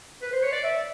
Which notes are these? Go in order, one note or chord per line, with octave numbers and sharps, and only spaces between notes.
B4
C5
C#5
D5
E5